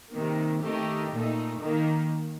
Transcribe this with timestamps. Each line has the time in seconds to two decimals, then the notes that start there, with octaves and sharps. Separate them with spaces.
0.12 C3 D#3 A#3
0.62 D#3 A3 D#4 G4
1.12 A#2 A3 D#4
1.62 D#3 A#3 D#4